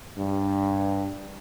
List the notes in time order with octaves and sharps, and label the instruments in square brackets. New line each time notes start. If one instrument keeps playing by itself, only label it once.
[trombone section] G2